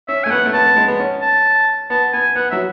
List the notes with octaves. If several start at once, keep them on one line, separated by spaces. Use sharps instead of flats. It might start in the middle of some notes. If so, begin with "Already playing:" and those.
C#4 E5
A3 G#5
B3 F#5
A3
B3 A5
B3
G#3
B3
C#4
A5
B3 A5
B3 G#5
B3 F#5
F#3 E5